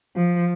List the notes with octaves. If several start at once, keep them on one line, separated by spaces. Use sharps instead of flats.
F3